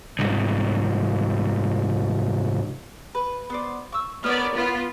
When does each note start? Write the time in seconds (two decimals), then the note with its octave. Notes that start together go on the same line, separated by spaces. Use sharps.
0.19 C2 G#2
3.15 B4
3.50 B3 C5 D5
3.92 C#6 E6
4.24 B3 A#4 C#5 D5 F6
4.55 B3 F4